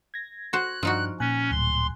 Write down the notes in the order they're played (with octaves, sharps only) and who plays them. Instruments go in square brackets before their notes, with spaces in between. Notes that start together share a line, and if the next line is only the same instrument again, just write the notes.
[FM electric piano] G#6 A#6
[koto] F#4 C5 [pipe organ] F#6
[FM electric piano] G2 D4 F6 [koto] F3 D#4 F#4
[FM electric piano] A#2 G#5 F#6 [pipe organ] C#4
[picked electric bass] D1 [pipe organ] C6